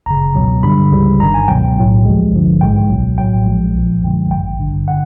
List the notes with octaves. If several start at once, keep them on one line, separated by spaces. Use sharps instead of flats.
G1 F#2 C#3 A#5
C#2 B2 F#3
G2 D3 G3 B5
C#2 C#3 E3 G3
G1 G2 D#3 A#5
G#5
C#2 B2 F#3 G5
B1 A2 F#3
D2 C3 F3 G#3
A1 G2 D3 F3
A#1 G#2 E3 G#3 G5
C#2 B2 F#3
A#1 A2 F#3 G5
A#1 A#2 F3 G#3
B1 A#2 F3
F#2 D3 F3 G#3
A1 G2 D#3 G5
G1 G2 D3
D3 F#5